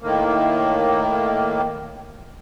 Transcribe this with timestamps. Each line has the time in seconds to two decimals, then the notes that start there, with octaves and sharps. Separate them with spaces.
0.02 A2 D#3 A#3